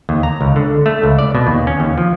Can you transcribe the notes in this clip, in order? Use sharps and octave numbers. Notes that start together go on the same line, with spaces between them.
D#2
A#5
C#2
D3
A3
C#2
D5
B2
D#2
C#4
D#2
F3